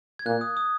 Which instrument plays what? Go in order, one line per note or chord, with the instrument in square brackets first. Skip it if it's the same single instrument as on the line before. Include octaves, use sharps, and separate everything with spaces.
[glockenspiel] G#6
[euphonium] A#2 [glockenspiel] F#6
[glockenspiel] D#6
D#6